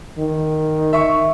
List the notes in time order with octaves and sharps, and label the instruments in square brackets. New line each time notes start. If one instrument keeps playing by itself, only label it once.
[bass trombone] D#3
[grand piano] E5 C#6